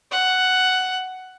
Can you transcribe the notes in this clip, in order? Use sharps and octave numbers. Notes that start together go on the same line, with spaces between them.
F#5